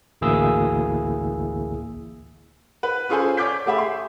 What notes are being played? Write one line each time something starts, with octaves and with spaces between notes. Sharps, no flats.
A1 D2 A#3 E4 G#4 E6
B4
C#4 F4 G#4 A4 C5 G#5
C#5 D5 D6 G6 B6
A3 G4 G#4 E5 B5
C6